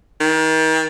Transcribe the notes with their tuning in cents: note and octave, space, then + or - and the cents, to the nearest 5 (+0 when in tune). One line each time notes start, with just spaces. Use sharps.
D#3 +35